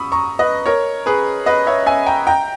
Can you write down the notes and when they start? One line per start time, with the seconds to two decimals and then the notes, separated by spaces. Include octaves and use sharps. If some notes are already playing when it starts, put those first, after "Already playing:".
Already playing: B5 C#6 D#6 E6
0.12 A#5 C#6
0.39 B4 D#5
0.66 A#4 C#5
1.06 G#4 B4
1.46 B4 D#5
1.67 C#5 E5
1.86 E5 G#5
2.06 G5 A#5
2.27 G5 A#5